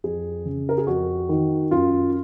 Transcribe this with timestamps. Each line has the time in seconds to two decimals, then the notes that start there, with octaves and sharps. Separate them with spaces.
0.04 F2 G#4
0.45 C#3
0.69 A#4
0.78 G#4
0.87 F2 F#4
1.29 D#3
1.71 F#2 F4